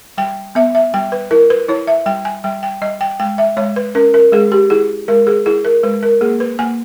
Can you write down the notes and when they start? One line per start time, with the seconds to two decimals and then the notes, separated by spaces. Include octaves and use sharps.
0.18 G3 G5
0.55 B3 E5
0.75 E5
0.94 G3 G5
1.12 B4
1.31 E4 A#4
1.50 B4
1.69 E4 C#5
1.87 E5
2.06 G3 G5
2.25 G#5
2.44 G3 G5
2.63 G5
2.81 G3 D#5
3.01 G5
3.20 G#3 G5
3.38 E5
3.57 G#3 C#5
3.76 B4
3.95 C#4 A#4
4.14 A#4
4.32 G#3 G#4
4.52 G4
4.70 E4 G#4
5.08 G#3 A#4
5.27 G#4
5.46 E4 G#4
5.65 A#4
5.83 G#3 B4
6.03 A#4
6.21 A#3 G#4
6.40 B4
6.59 A#3 G#5